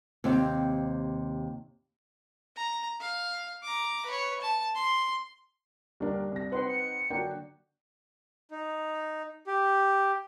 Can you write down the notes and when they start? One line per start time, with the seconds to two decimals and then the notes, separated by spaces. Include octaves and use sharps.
0.24 D#2 C3 C4
2.56 A#5
3.00 F5
3.63 A#5 D6
4.06 B4 C#5
4.41 A5
4.75 C6
6.00 D#2 D3 G3 D4 A#4
6.32 C2 A#6
6.52 C4 D#4 B4 F#5 C6
6.67 C#7
7.10 D3 F#3 A#3 D4 G5
8.51 D#4
9.47 G4